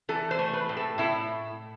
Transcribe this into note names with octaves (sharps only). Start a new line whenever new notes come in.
E3 A4
C5
A3
B4
A2
A4
A2 E4